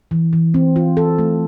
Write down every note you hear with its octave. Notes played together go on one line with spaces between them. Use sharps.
E3
E3
C4
F4
A4
A3